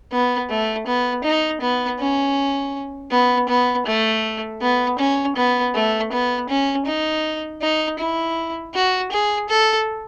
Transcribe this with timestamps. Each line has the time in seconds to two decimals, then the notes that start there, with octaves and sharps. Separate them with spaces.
0.12 B3
0.50 A3
0.87 B3
1.24 D#4
1.61 B3
2.00 C#4
3.11 B3
3.49 B3
3.86 A3
4.61 B3
4.99 C#4
5.36 B3
5.74 A3
6.12 B3
6.49 C#4
6.86 D#4
7.62 D#4
7.99 E4
8.74 F#4
9.12 G#4
9.49 A4